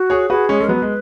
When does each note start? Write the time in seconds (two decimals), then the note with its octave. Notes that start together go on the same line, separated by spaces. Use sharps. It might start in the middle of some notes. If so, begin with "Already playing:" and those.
Already playing: F#4
0.10 G#4 C#5
0.30 F#4 G#4 B4
0.49 G#3 C#4
0.60 G#3
0.68 F#3 B3 B4
0.82 G#3